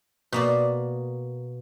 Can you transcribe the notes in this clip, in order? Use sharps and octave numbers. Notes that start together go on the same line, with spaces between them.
B2 A#3 D5